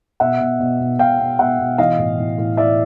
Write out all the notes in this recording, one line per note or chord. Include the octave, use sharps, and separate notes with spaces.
B2 E5 F#5
B2
B2
B2
B2 F5 G5
B2
B2 E5 F#5
B2
E3 D#5 F5
A2
A2
A2
E3 D5 E5